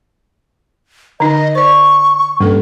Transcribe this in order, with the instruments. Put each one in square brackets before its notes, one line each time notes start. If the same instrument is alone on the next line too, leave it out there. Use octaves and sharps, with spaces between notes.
[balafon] D3 D#4 [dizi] D#5
[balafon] C5 D5 [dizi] C#6
[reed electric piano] G2 [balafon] A#3 C#4 A4